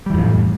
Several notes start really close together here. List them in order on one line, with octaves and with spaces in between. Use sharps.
G3 E3 F2 A2